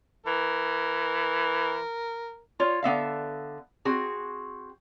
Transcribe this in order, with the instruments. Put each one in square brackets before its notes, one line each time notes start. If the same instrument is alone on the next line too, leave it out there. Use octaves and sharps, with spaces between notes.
[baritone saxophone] E3 [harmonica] A#4
[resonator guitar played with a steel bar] F4 C#5
D3 B3 E5 F5
C4 F#4 G#4